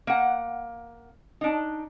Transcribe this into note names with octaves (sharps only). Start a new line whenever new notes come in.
A#3 F#5
D4 D#4